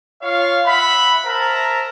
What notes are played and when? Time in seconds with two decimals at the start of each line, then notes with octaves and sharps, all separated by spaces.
0.22 F4 C#5 F5
0.65 E5 F#5 B5
1.26 A#4 C5 E5 A5 A#5